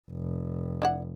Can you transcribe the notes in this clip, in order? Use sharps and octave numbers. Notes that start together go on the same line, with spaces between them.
F1
D4 E4 F#5